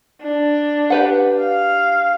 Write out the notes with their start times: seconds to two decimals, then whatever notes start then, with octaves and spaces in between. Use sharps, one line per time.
0.22 D4
0.90 G4 B4 F#5
1.40 F5